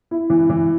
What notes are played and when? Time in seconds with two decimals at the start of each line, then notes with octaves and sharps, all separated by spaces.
0.11 E4
0.30 E3
0.50 E3